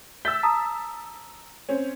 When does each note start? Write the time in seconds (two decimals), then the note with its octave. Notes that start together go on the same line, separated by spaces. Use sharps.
0.25 E5 E6 G6 A6 B6 G7
0.43 A5 A#5 D#6
1.69 C4 C#4